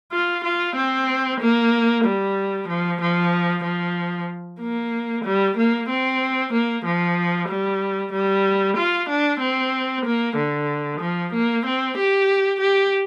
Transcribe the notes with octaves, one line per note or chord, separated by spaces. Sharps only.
F4
F4
C4
A#3
G3
F3
F3
F3
A#3
G3
A#3
C4
A#3
F3
G3
G3
F4
D4
C4
A#3
D3
F3
A#3
C4
G4
G4